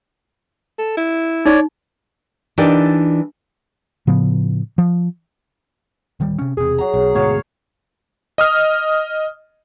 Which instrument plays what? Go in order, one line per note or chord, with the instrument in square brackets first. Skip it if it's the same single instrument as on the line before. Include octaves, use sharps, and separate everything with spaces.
[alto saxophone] A4
E4
[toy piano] D#4 [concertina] C#5 D5
[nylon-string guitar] E3 D4 D#4 G4 A#4 D5
[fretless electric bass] A2 C#3 F3 B3
F3
[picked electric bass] D1 D#3 G3
C3 C#4
[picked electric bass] E1 C3 [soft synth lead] G#4
[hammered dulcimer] F#3 A#5
[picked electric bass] B1
[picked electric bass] D2 G#2 B2 [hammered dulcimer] F#4 C#5 F5
[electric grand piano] D#5 D#6 F6